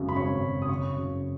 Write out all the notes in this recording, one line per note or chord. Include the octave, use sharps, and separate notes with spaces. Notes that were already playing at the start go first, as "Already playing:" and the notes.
Already playing: G#1 F#2 C#3
B5
G#1 C#5 C#6
F#2 C#3
D#6
F#1 C#5 C#6
F#2 C#3